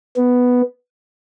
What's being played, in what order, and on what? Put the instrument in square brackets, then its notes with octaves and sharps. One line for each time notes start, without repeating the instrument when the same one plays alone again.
[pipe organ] B3